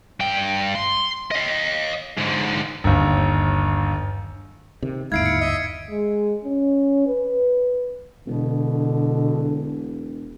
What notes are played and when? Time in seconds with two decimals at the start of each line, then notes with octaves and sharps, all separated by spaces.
0.20 G2 G5
0.75 C6
1.31 D#5 F5
2.17 G#2 D3
2.84 G1 D#2
4.83 C3 D#3
5.12 G1 D#2 G#2 E4 F5 G#6 C7 D7
5.26 C#7
5.40 D#5 E5
5.91 G#3
6.45 C#4
7.07 B4
8.27 E1 B2 D3